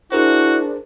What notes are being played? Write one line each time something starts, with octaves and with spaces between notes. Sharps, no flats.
D4 E4 F#4 G#4 A#4 C5